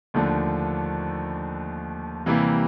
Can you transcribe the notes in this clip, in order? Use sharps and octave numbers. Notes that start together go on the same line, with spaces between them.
D#2 D3 F3 A3 D4
C3 E3 G3 A#3